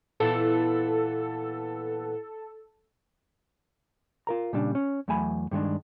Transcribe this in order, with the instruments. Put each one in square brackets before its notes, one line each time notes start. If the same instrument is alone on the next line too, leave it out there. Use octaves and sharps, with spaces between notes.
[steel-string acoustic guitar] A#2 E3 B3 [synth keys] A4
[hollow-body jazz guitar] F4 A#4 A#5
A#2 C#3 G3 D4
C#4
E2 F#3 A3 F#5 G#5 B5
G2 D#3 G#3 D4